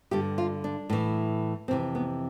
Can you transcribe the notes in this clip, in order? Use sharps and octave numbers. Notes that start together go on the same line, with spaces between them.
G2 D3 G4
F4
D4
A2 E3
F2 C3 E3 C4
B3